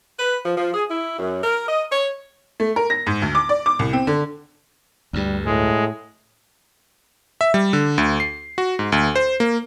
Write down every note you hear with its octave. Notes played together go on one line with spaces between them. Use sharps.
B4
F3
F3
G#4
E4
F#2
A#4
D#5
C#5
A3
A#4
A#6
G#2
D2
D6
D5
D6
C2
C4
D3
D2 G2 G3
A2 G#3
E5
G3
D3
D2
C7
F#4
G#2
D2
C5
A#3